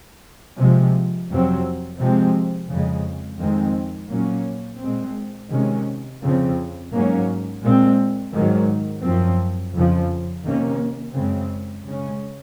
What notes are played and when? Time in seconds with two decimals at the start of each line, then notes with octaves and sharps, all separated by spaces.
0.58 C3 F3 G#3
1.30 F2 C3 F#3 C4
2.00 C3 F3 G#3 C4
2.69 F2 C#3 G#3
3.40 F2 D#3 G#3 C4
4.10 A#2 F#3 A#3 C#4
4.82 A#2 G#3 C4
5.51 C3 D#3 G#3 C#4
6.22 F2 C#3 F3 C4
6.93 G#2 F#3 A#3 C#4
7.62 A#2 G#3 C4
8.34 G#2 D#3 F#3
9.04 F#2 F3 C4
9.73 F2 C#3 F3
10.45 C3 D#3 A#3 C#4
11.15 F#2 C#3 G#3 C4
11.85 C#3 G#3 C#4